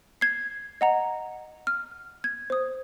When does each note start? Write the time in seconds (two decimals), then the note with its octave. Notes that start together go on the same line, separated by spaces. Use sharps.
0.21 G#6 C7
0.81 D#5 F#5 A#5
1.67 F6
2.24 G#6
2.50 C5 D#6